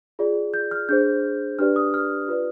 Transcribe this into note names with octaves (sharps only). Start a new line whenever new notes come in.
F4 G#4 D5
G6
F6
D4 G#4 C5 G6
D4 G4 B4 D5 F6
D#6
F6
F4 B4 D5